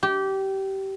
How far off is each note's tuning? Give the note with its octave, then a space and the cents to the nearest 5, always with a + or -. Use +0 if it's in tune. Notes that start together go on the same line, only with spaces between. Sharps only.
G4 -20